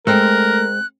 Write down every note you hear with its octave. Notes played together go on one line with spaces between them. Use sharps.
G#3 A3 C4 A#4 F#6